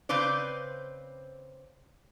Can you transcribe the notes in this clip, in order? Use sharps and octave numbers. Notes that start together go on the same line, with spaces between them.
C#3 C4 B4 C5 D5